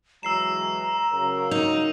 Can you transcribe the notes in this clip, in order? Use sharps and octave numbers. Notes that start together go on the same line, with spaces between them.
E3 F#3 G#3 A#5 E6 C7 E7
C#3 F#3 A#4
D#4 F7